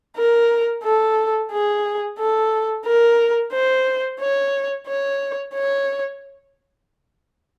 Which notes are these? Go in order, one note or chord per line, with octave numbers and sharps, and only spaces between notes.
A#4
A4
G#4
A4
A#4
C5
C#5
C#5
C#5